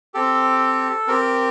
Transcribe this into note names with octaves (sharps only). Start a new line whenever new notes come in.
C4 G4 A4
C4 G4 A#4